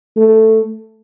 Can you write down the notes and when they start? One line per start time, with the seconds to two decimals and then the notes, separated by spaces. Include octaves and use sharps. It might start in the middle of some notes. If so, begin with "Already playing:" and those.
0.16 A3